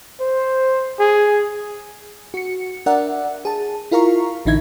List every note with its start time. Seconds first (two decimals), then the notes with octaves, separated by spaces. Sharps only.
0.20 C5
0.99 G#4
2.34 F#4 C#7
2.86 D4 A#4 D5 E5 F#5
3.45 G#4 A5
3.91 E4 F4 A#4 F5 A#5 C#6
4.46 A1 D3 E3 D#4 E5 G#6